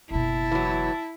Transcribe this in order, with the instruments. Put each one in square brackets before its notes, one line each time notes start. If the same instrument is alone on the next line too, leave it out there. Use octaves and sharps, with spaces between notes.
[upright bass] F#1 B2 [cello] E4 [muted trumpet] A5
[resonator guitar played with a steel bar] E3 F#3